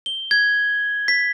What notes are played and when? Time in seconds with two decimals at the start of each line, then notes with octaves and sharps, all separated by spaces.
0.06 G7
0.31 G#6
1.08 B6